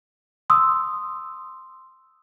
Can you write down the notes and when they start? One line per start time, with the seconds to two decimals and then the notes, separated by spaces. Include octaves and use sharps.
0.50 C6 D#6 E6